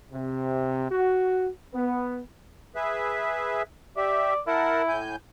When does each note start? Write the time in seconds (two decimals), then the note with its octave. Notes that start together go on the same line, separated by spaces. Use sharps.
0.12 C3
0.90 F#4
1.74 B3
2.75 G#4 B4 E5
3.97 G4 D5 E5
4.47 E4 A#4 F#5 A5
4.88 A2 G#5 G6